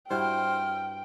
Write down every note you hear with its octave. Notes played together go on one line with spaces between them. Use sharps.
G2 E4 F#4 C5 G5 F6